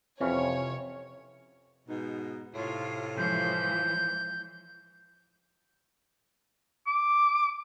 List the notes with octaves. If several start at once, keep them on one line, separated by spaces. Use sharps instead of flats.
F2 C3 E3 C#4 C#5
G#2 B2 D#4
A2 C3 F4 C#5
E3 F3 G#3 G6
D6